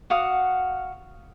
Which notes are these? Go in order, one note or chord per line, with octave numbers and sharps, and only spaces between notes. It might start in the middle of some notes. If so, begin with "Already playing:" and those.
F#4 F5 F#5 D#6